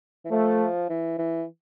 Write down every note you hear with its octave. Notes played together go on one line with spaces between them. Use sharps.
E3
F3 A3
E3
E3